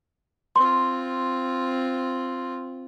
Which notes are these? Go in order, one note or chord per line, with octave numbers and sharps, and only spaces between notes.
C4 F4 C6